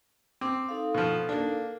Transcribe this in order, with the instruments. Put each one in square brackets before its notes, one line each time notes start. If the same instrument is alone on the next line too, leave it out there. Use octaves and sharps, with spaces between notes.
[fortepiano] C4 [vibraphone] D6
[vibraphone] D#4 A4 F5
[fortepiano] B2 F3
A#3 D4